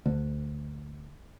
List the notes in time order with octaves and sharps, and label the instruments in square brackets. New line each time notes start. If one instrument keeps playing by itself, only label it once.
[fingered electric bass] D2